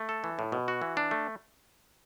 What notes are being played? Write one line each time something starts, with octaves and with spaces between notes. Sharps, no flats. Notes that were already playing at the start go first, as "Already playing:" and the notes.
Already playing: A3
A4
E3
A2
B2
F#4
E3
D4
A3